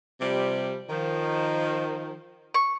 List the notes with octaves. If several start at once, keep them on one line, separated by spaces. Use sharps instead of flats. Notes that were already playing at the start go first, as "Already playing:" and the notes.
C3 F3 G3
D#3 F3
C#6